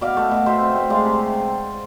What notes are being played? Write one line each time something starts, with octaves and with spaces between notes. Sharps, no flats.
B2 D5 F5
A3
B2
B2 C5 E5
C4
A3
G#3 D5 F5
C3
C3